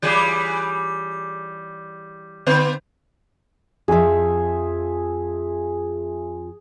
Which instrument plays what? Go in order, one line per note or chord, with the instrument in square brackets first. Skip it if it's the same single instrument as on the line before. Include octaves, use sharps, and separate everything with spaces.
[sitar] E3 G3 G#4
D3 B3 C5
[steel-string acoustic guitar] F2 F3 [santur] G#4 E5